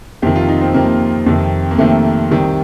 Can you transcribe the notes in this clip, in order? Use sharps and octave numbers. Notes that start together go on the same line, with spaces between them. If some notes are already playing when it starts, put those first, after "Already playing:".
F2 C3 D#3 G4
F4
D#4
C4
F2 C3 D#3 A#3
F2 C3 D#3
A#3
F2 C3 D#3 A3
C2 C3 D#3